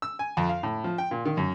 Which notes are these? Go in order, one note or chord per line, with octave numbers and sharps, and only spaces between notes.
E6
G#5
F2
F5
A2
F3
G5
A#2
D#3
F#2